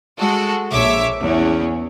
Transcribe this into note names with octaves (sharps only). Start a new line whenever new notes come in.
G#3 F#4 A4
A#1 C#5 E5 D6
E2 C#4